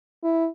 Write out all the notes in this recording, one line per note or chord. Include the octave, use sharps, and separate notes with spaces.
E4